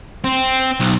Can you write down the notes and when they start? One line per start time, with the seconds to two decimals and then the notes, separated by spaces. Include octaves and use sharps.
0.24 C4
0.80 B1